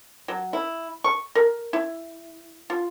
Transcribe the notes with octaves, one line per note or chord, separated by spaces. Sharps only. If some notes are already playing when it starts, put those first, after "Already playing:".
F#3
E4
C#6
A#4
E4
F4